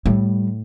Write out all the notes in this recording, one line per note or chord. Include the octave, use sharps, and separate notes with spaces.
A2 G3